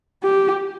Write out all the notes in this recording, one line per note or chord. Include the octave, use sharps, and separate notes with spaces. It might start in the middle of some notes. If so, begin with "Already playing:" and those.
G4